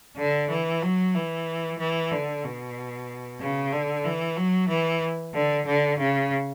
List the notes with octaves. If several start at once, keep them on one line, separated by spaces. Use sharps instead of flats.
D3
E3
F#3
E3
E3
D3
B2
C#3
D3
E3
F#3
E3
D3
D3
C#3